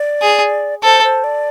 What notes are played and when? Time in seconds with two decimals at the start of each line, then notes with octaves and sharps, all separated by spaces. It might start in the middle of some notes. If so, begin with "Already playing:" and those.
Already playing: D5
0.22 G#4
0.83 A4 C5
1.04 C5
1.24 D5